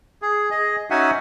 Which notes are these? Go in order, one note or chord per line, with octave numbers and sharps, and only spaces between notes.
G#4
G#4 D#5
C#4 D#4 F#4 E5 F#5 G#5